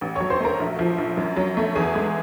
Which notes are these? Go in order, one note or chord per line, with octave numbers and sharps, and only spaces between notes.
A1
C#5 C#6
F#3
C5 C6
A3 A#4 A#5
A#1
F3
A#1
F#2
F#3
A3
E2 G#4 G#5
G#3